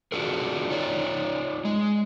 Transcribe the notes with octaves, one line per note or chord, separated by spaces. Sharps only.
D4 F4 F#4 G#4 A#4
D#4 F4 C#5 D5
G#3